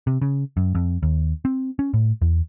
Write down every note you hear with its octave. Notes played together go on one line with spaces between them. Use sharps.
C3
C#3
F#2
F2
D#2
C4
C#4
A2
E2